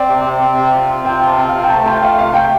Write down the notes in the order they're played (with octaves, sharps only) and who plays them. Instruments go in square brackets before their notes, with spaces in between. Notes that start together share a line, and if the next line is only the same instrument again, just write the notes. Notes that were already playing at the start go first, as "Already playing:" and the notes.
Already playing: [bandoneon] C4 [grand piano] D5
[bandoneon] C3
C3
C4
C3
F4
C4
[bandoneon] C3 [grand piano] G5
[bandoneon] F4
[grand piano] A5
[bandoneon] C4
[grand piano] F5
[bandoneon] C3
[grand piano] G5
[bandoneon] A3 [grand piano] A5
[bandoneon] F4 [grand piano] G5
[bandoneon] A3 [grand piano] F5
[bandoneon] C3 [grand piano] F5
[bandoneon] A3 [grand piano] G5